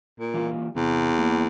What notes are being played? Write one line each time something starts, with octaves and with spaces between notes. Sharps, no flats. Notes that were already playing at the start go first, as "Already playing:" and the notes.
A#2
E3 G3 A#3 F4
E2 C3
G3 A#3 E4